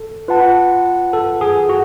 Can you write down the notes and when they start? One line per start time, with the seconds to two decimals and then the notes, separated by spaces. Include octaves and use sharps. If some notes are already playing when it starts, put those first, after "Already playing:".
Already playing: A4
0.28 F4 B4 F#5 A5
1.13 A4
1.41 G#4
1.69 F#4